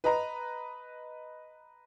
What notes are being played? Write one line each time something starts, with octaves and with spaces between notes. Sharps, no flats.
B4 D#5 A#5